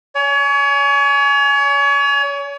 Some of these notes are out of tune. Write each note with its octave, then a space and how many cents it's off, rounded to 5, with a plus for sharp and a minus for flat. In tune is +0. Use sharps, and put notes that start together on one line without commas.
C#5 +35 G#5 +10